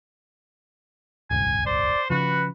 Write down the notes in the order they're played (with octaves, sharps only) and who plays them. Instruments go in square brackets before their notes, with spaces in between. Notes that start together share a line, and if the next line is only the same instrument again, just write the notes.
[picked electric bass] D1 G1 C2 [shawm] G#5
[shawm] C5 [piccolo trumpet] D5
[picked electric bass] C#3 F3 [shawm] F#4 [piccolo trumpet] B4